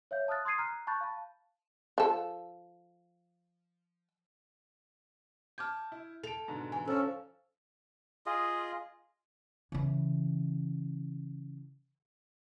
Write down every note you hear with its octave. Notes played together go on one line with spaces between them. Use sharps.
C#5 E5 F5 G6
A5 D#6 F6 F#6 A6
C6 D#6 G#6 C7 D#7
A#5 F6 F#6
A5 B5 C#6 F#6 G6 A6
F5 A5
F3 A4
A5 D6 F6 G6 G#6
E4
A4 D7 F7
G#2 B2 D3
E3 G#5
F3 C#4 D4 A4 C5
F4 G#4 D#5
C#3 E3